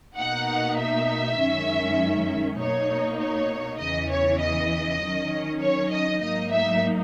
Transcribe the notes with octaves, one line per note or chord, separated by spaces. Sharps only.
B2 A#3 D#4 F#5
E5
F#2 D#3 G#3 C#4
B2 A#3 D#4 C#5
C#5
E2 C#3 E3 D#5
C#5
D#5
D#3 F#3 C#4
C#5
D#5
G#2 F#3 A#3 D#4 D#5
E5